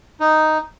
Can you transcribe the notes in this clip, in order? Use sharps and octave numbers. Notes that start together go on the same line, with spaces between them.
D#4